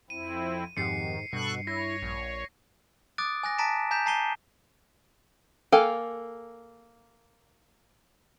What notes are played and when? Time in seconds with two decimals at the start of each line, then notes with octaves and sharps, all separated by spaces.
0.10 F2 C4 E4 D#7
0.77 F2 G#2 D#3 G4 F#5 C7 C#7
1.33 G2 B2 A4 C#6 F#6
1.67 E4 C#5 A#6
2.02 A#1
3.18 D6 D#6 F#6 A6 D7
3.43 G#5 F#6 A#6
3.58 A5 A#5 A6 B6 D7 E7
3.91 G#5 A#5 G6 B6 E7
4.06 A5 A#5 C7 D#7 G7
5.72 A#3 A4 F5 G5 G#5